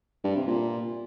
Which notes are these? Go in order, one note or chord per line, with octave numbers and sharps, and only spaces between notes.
G2
C3
A#2